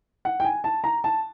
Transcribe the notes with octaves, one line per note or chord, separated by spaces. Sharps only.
F#5
G5
G#5
A5
A#5
A5